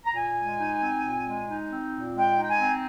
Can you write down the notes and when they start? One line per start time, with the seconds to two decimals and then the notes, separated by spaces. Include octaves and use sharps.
0.05 A#5
0.14 A#2 G#5
0.37 G#3
0.59 D#4
0.81 C4
1.04 A#2
1.26 G#3
1.48 D#4
1.70 C4
1.93 A#2
2.15 G#3 G5
2.37 D#4
2.44 G5
2.49 G#5
2.60 C4